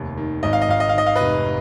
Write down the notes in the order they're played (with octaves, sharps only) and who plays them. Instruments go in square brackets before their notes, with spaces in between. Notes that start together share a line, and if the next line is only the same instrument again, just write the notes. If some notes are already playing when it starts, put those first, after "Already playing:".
Already playing: [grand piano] F1 D#2
D#3
G#1 D#5
F5
D#5
G#1 F5
D#5
F5
D#3 D#5
F5
F1 B4 D#5